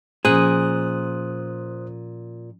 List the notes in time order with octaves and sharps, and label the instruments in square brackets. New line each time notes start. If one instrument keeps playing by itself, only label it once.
[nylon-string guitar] A#2 [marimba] F3 C#4 [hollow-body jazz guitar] G#4 [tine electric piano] C5 D#6 F#6